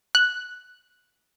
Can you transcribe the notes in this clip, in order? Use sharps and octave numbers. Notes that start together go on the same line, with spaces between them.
F#6